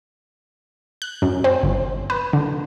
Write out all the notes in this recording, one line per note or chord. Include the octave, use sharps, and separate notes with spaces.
F#6
F#2
C4
G1
B4
D3